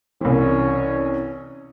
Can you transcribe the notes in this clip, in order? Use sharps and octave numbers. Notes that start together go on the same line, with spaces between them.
C2 E3 C#4